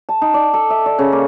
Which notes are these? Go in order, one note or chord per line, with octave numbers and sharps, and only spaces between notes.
A5
D#4
D5
A4
E5
D5
C#3
A#3